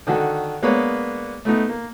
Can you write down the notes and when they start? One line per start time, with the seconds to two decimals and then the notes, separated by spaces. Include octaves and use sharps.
0.07 D3 D#3 F#4 A4
0.62 G#3 A#3 B3 D4 B4 C#5
1.45 A3 B3 D#4
1.69 A#3